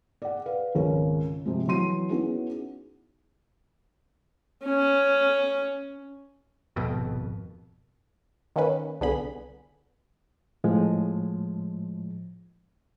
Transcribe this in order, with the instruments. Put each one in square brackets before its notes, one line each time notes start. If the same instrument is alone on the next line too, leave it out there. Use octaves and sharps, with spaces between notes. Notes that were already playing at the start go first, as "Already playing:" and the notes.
[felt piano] D5 F#5
B4 F5
G#1 C#2 A#4 C#5
C3 F3 G#3
E3 F#3 C6 D#7
B3 C#4 D#4 E4 F#4 G#4
[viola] C#4
[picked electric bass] D#1 G#1 F2 B2
[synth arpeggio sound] D#3 A#3 C#4 B4
C2 D3 B3 G#4 B5
[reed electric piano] A2 F3 G#3